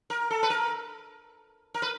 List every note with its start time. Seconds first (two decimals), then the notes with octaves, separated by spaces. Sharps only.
0.10 A#4
0.30 A4
0.43 B4
0.50 A#4
1.74 A#4
1.82 B4